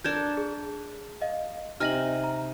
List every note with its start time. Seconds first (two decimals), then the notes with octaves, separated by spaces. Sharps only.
0.04 D4 A4 A#4 G6 G#6 E7
0.37 G#4
1.21 D#5 F5
1.80 C3 D#4 G#5 F6 A#6 F#7
2.24 A#5